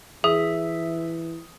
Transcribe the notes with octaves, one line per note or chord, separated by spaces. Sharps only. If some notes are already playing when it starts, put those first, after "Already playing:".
E3 G#4 E5 D#6